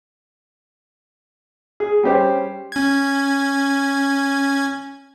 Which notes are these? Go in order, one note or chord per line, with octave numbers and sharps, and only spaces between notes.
G#4
G3 C#4 G4 C5
C#4 G#6